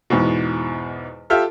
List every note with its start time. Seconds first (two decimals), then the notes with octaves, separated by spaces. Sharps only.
0.10 E2 G#2 B2
1.30 F4 G4 A4 E5 F6